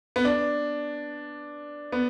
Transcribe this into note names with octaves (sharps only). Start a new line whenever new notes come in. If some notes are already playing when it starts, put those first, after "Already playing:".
B3
D4
B3